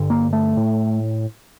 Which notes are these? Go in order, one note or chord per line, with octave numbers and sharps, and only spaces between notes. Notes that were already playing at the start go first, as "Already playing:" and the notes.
Already playing: G2 D3
A#3
A3
A2